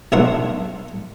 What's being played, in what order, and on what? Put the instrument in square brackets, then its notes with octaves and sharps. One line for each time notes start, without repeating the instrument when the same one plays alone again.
[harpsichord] B1 D4 A#4 E5 F#5 C6